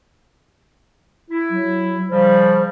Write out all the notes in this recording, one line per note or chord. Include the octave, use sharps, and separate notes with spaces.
E4
F#3
C#3 F3 G3 C5